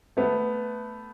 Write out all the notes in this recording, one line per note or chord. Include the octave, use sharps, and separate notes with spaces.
A3 B3